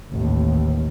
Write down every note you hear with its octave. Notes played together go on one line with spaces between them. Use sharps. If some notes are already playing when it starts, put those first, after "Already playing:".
A1 D#2